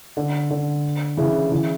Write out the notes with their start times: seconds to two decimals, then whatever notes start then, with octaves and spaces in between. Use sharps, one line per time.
0.17 D3
0.50 D3
1.17 C#3 E3
1.52 C#3 E3